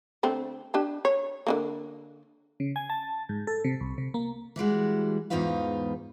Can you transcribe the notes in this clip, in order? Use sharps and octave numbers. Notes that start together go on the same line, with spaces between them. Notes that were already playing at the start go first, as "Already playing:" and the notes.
D3 A3 C4
D4 G4 A5
C#5
D3 E3 A#3
C#3
G#5
A5
G#2
A4
C3
C2
C3
A#3
E3 G3 G#3 F#4
E2 G#2 D#4 F4 B4 F5